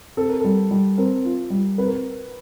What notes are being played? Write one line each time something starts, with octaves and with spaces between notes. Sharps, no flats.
C4 A4
A#4
G3 A4
G3
C4 A#4
F4
G3
C4 B4
A#4